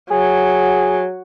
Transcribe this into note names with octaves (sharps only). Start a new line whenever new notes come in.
F#3 G#4